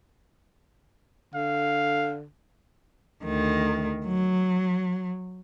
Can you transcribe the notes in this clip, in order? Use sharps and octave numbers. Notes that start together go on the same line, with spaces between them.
D3 F5
D2 D#3
F#3